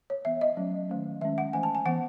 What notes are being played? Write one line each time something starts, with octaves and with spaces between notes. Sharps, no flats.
C#5
E3 B3 E5
D#5
F#3 A3 C#4
D#3 A3 C#4
D#3 G#3 C#4 E5
F#5
E3 A3 C#4 G#5
A5
G#5
E3 B3 F#5